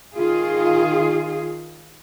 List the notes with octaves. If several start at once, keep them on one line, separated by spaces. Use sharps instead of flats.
D#3 F4 G#4